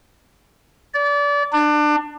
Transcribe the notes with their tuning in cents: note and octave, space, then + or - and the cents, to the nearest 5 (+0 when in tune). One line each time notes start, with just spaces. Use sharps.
D5 -30
D4 +25